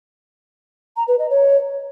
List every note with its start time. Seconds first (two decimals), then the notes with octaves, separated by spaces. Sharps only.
0.97 A#5
1.08 B4
1.19 D#5
1.30 C#5